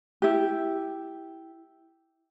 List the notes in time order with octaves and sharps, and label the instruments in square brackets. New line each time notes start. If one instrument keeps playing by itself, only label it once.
[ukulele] E4 G4